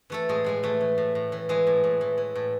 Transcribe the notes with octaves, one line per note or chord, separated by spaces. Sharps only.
E3 A3 A4
A2 G#3 G#4
A2 G#3 G#4
E3 A3 A4
E3
A2
A2
E3
E3 G#3 G#4
A2
A2
E3
E3
A2